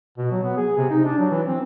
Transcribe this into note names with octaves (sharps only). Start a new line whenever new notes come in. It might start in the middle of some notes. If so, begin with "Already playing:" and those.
B2
F#3
B3
G#4
C3
D#4
D4
F#3
E3
C4